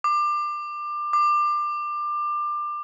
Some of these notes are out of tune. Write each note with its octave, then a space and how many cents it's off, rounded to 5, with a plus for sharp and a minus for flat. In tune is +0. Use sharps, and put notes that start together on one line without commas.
D6 +25
D6 +25